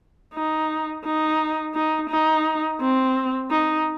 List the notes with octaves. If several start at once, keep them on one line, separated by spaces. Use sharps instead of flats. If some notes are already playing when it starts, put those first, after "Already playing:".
D#4
D#4
D#4
D#4
C4
D#4